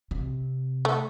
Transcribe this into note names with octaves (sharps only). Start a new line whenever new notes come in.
C3
A3